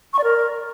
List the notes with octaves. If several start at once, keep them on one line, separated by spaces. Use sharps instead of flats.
C#6
D5
A#4